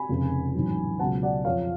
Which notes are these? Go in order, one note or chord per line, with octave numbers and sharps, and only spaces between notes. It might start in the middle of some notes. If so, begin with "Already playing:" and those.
Already playing: G#5 B5
F1 F2 C#3 F3
A1 G#2 F#3
C#2 B2 F#3 F#5 A5
D5 F#5
F2 F3 C#5 F5